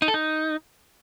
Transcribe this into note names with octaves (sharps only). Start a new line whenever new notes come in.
D#4
A4
D#4